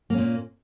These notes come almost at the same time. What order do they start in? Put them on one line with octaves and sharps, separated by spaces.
A#3 C#4 A#2